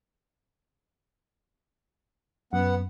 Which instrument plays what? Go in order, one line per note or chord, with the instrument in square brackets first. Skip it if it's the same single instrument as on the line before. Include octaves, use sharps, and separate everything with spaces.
[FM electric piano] F#2 [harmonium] B3 F#5